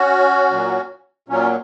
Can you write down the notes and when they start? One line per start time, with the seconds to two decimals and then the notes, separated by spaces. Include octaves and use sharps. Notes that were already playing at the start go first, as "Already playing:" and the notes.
Already playing: C#4 F#4
0.50 A#2 F#3
1.28 A#2 F#3 C#4